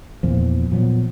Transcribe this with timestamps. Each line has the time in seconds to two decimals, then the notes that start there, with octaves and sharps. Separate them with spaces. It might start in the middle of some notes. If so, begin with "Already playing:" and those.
0.23 E2 A#2 F3
0.72 A#2 F3 F#3 B3